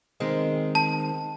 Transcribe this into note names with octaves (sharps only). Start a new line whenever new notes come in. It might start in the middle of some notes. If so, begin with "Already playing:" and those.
D#3 G#3 C4
A5